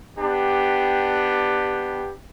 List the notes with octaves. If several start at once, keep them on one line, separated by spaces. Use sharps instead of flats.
B3 D4 G4